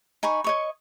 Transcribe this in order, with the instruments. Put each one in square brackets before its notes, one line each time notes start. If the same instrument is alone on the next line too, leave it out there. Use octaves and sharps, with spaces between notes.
[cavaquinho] D#4 G#5 B5 C#6
C#5 D#5 C#6